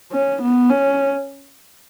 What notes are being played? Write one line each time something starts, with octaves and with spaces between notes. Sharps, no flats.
C#4
B3
C#4